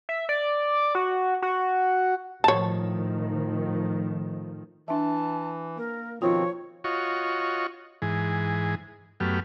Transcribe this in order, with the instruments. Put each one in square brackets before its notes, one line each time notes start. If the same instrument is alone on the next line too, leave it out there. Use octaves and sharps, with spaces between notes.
[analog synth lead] E5
D5
F#4
F#4
[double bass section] A2 D#3 F3 [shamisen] C#5 A5
[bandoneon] E3 [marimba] D4 E5 [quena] A5
[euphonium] A#3 [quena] A#4
[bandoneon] B2 D#3 C4 [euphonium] F3 [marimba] F4 [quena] C#5
[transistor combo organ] F4 F#4 C#5 D#5 C#6
G#2 E3 G#4
F#2 F#3 A3 B3 G4 F6